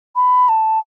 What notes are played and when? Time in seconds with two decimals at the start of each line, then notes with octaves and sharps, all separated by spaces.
0.16 B5
0.49 A5